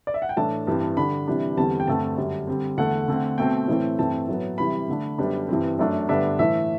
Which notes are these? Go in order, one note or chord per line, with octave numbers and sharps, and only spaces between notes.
D5
E5
F#5
G5
A2 E3 A3 D4 A5
G2 E3 G3 C4
D3 G3 D4 B5
C3 E3 G3 D4
E2 D3 G3 C4 A5
G5
G2 D3 A3 C4 A5
F#2 D3 G3
D3 G3 C4
E2 D3 A3 F#5
D3 A3 C4
B2 A3 C4 G5
A2 E3 A3 C4
G2 E3 A3 C4 A5
A2 F#3 B3
C3 E3 G3 B5
D3 A3 D4
F#2 D3 G3 B3 D4
G2 E3 G3 C4
F#2 F#3 A3 D4
G2 D3 G3 B3 D4 E5
A2 E3 A3 E5